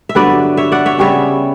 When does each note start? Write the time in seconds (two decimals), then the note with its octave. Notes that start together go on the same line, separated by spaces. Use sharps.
0.09 E5
0.15 G2 D3 F#3 B3 B4 D5
0.57 C#5 E5
0.72 D5 F#5
0.86 C#5 E5
0.98 C#3 G3 B3 C#5 E5